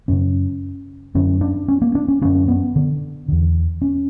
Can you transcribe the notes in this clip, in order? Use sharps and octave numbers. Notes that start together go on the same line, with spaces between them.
F#2 C#3 C#4
F#2 D3 C#4
D4
C#4
A#3
D4
C#4
F#2 D3 C#4
B3
D3
E2 D3
C#4